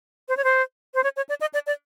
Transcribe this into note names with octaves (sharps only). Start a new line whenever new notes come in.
C5
C#5
C5
C5
C#5
C#5
D5
D#5
D5
D5